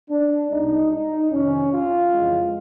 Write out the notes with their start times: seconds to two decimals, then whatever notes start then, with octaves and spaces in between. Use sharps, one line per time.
0.11 D4
0.51 C2 B2 G#3 D#4
0.92 D#4
1.31 F2 C3 D#3 C#4
1.72 F4
2.12 F2 C#3 E3 G#3